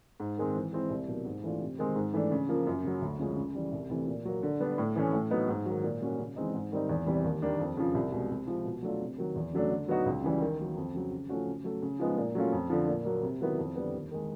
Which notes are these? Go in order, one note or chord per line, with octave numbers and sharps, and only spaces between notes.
G#2
D#3 G#3 C4
E3
G#3 C4 E4
C2
B2 F#3 A#3
G#2
E3 A3 D4 F4
C3
D#3 G#3 C4
G#2
E3 A3 D4
C#3
F3 A#3
F#2
C#3 F#3
D2
C#3 F3 G#3 C#4
C#3
E3 G3
C2
C3 E3 A3
A#2
F#3 A#3
D3
G3 B3 D4
A2
E3 A3 C#4
A2
F#3 B3 D#4
G#2
D#3 F#3
A#2
G3 A#3 C#4 F#4
C#3
E3 G#3 C4 D#4
G#2
D#3 G3 C4 D#4
E2
C3 E3 G3
D#2
D#3 G3 A#3 D4
F2
C#3 F3
C2
B2 G#3
C3
F3 G#3
B2
F#3 A3 D4 F4
C3
D#3 F#3
E2
C#3 F#3 A3 D4
D3
F#3 B3 D#4 F#4
C#2
C#3 E3 G3
D#3
F#3 A#3
F2
C#3 F#3
C#3
F3 A3 C#4 F#4
C#3
F#3 A3
C#3
F3 G#3 B3 D#4
A#2
F#3 A3 C#4 F4
F2
D3 F3
A#2
F#3 A#3
C3
D#3 F#3 B3 E4
F2
D3 G3 B3
D#2
D#3 G#3